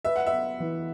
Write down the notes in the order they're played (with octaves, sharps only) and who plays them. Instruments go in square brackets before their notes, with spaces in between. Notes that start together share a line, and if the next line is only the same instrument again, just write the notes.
[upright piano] B4 [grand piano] E5
[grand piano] F#5
[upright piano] B3 [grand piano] E5
[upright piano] E3